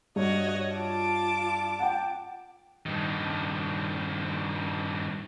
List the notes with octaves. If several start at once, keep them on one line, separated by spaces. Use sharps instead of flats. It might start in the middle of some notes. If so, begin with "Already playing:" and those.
G2 F#4 C#5 D#5
F4 A5 D6
F#5 G5
G2 D#3